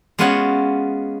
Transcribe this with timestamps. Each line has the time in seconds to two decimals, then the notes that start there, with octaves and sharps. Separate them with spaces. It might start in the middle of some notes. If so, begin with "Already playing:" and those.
0.19 G#3 B3 C#4 F4 F#4 C#5